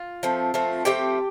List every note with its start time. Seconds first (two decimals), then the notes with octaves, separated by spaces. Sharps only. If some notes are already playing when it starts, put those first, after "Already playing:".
Already playing: F4
0.23 F3 A3 C4
0.54 F3 A3 C4
0.85 F3 A3 C4 G4 G5